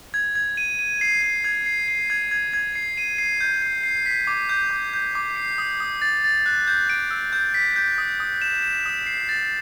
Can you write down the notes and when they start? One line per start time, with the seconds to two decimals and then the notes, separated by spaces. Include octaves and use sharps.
0.14 G#6
0.35 G#6
0.57 D#7
0.79 D#7
1.01 C7
1.22 C7
1.44 G#6
1.66 C7
1.88 C7
2.10 G#6
2.31 G#6
2.53 G#6
2.75 C7
2.97 D#7
3.18 C7
3.41 G6
3.62 C7
3.83 C7
4.06 B6
4.27 D6
4.49 G6
4.71 D6
4.94 G6
5.15 D6
5.36 C7
5.58 D#6
5.80 D#6
6.02 A6
6.24 A6
6.46 F#6
6.67 G6
6.89 D7
7.11 E6
7.33 G6
7.54 B6
7.76 G6
7.98 D#6
8.20 D#6
8.42 E7
8.63 E7
8.85 D#6
9.06 C7
9.29 A6